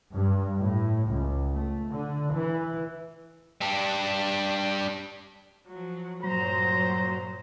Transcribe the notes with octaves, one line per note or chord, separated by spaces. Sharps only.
G2
A2
C#2
A3
D3
E3
G3 D4
F3 F#3
G2 A#2 F#3 C5 A#5